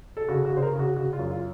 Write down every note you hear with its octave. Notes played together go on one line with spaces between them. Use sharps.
A4
C#3 F#4
F#4
C#3
C5
A#4
C#3
F#4
C#3 F#4
F4
F#2
F4